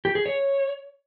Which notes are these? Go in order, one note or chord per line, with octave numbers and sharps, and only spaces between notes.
G4
G#4
C#5